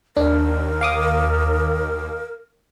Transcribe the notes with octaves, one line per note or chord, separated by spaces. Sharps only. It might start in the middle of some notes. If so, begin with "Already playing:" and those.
D#2 D4 A#4
F5 D6 D#6